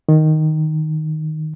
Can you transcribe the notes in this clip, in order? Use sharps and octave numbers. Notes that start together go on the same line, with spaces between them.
D#3